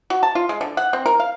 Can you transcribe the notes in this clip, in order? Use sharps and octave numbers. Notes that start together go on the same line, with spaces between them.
F#4
A5
F4
G#3
D3
F#5
C4
A#4
F5